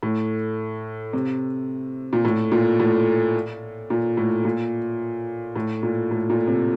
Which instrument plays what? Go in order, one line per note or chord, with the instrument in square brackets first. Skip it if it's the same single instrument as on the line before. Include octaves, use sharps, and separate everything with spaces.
[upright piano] A2
C3
A#2
A2
A#2
A2
A#2
A2
A#2
A2
A#2
A2
A#2
C3